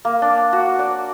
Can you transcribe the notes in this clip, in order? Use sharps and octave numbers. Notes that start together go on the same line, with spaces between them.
A#3
D4
F#4
D5